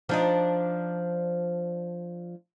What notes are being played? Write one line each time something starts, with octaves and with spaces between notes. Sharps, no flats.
F3 D4 D#4